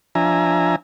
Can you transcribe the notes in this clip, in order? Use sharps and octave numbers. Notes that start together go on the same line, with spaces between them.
F3 D4 E5 G#5 A#5